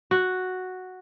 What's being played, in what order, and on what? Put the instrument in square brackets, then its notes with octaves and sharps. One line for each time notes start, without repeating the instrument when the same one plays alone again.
[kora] F#4